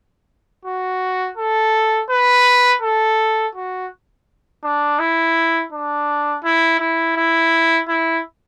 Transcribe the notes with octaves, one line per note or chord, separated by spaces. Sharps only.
F#4
A4
B4
A4
F#4
D4
E4
D4
E4
E4
E4
E4